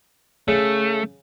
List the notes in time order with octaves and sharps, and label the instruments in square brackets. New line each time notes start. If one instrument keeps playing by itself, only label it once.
[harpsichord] C#3 [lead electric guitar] A3